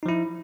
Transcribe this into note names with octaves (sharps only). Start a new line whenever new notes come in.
F3 D#4 E4